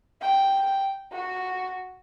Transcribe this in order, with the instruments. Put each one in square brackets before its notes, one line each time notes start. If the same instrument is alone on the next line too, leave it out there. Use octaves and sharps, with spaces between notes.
[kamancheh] G5
F#4